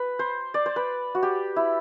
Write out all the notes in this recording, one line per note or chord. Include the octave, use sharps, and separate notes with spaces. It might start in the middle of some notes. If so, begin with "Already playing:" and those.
Already playing: B4
C5
D5
C5
B4
F#4
G4
E4